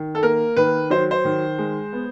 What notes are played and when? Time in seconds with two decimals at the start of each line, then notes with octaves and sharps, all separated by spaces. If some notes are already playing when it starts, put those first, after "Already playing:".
Already playing: D#3
0.15 A4
0.23 A#3 A#4
0.57 D#3 B4
0.90 F#3 C5
1.11 C5
1.25 D#3
1.58 G#3
1.93 B3